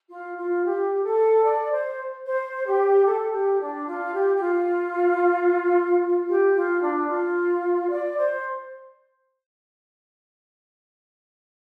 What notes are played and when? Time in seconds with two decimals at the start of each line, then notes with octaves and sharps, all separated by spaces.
0.09 F4
0.37 F4
0.64 G4
1.03 A4
1.44 D5
1.71 C5
2.25 C5
2.65 G4
3.05 A4
3.32 G4
3.59 D4
3.86 F4
4.13 G4
4.35 G4
4.40 F4
6.28 G4
6.55 F4
6.82 D4
7.09 F4
7.90 D5
8.16 C5